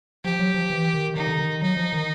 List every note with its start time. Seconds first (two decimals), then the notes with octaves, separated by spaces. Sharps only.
0.24 F3 G4
0.39 F#3
0.54 F3
0.70 E3
0.94 D#3
1.16 D#3 D#4
1.27 D3
1.39 D#3
1.62 F#3 D#4
1.77 F3
1.93 D#3